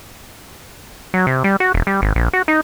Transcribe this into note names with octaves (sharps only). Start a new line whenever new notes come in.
F#3
C3
G3
F#4
E1
G3
G#1
A#1
F#4
D#4